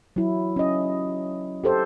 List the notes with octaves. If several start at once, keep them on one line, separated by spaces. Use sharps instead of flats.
F#3 E4
C#4 D#5
G4 A4 C5